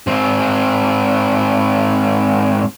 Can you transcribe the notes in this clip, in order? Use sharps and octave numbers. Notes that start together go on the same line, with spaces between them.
G#2 C4